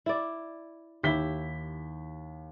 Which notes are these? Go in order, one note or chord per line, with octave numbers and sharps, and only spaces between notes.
E4 D5
D#2 E4 G4 B6 G7